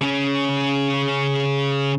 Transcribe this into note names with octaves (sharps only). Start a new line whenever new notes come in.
C#3 C#4